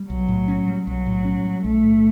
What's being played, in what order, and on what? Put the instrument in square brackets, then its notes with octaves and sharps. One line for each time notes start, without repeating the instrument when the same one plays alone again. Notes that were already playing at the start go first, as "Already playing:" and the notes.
Already playing: [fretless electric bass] G3
[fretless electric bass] B1 [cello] F#3
[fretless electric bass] A2
C#4
G3
[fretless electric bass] B1 [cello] F#3
[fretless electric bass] A2
C#4
G3
[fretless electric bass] B1 [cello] A3
[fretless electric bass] A2